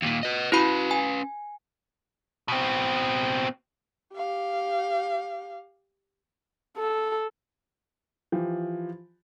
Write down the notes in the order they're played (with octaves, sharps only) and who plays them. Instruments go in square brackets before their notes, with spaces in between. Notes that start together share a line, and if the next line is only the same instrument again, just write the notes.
[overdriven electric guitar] D#2 A#2
B4 D#5
[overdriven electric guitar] C#4 B4 [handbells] E4 F#4 B5
[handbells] G#5
[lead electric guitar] B2 C4
[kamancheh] G4 F5
A4
[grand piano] E3 F3 G4